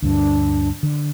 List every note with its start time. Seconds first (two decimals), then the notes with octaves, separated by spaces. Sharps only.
0.02 D2 G2 D4
0.83 D3